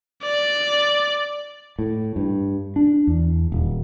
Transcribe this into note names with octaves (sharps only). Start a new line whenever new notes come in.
D5
A2
G2
D4
E2
D#1